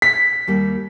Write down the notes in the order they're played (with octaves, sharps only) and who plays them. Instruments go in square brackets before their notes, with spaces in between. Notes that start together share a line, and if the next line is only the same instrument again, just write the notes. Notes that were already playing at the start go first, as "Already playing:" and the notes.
[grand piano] B6
[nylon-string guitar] D#2 G3 A#3